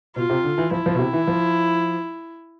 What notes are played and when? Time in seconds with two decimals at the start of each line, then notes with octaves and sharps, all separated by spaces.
0.16 B2 F4
0.30 C3
0.44 D3
0.58 E3
0.71 F3 E4
0.86 F3
0.95 B2
0.99 C3
1.13 E3
1.27 F3